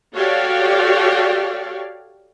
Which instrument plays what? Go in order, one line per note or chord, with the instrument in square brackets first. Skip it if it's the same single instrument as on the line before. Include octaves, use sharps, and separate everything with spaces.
[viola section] F#4 G4 A4 C#5 D5 F5